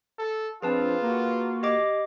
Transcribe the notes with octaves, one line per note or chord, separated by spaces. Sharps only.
A4
F3 C4 D4 F4 G#4 B4 A5
A#3 F#4
G4 D#5 D6